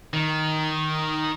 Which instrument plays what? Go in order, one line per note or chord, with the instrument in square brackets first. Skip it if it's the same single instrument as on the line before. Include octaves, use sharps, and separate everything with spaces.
[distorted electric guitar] D#3